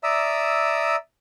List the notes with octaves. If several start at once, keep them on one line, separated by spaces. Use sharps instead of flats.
D5 E5 A#5 D#6 E6